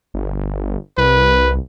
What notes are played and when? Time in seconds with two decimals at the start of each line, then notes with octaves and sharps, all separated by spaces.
0.14 G1
0.97 C2 B4